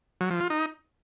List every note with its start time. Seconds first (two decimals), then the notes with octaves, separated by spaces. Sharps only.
0.21 F#3
0.31 F3
0.40 F4
0.50 D#4